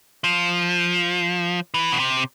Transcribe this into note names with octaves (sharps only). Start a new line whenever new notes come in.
F3
E3
B2
C3